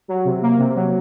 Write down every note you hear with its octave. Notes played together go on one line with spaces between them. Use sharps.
F#3
C3
A#3
C3
F#3